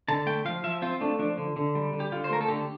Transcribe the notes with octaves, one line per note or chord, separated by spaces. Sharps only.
D3 A5
A3 G5
F3 F5
F3 E5
C4 F4
A3 D4
F3 D4
D3
D3
G3
D3
G4
D3 F4
C5
A3 A#4
A4
D3 G4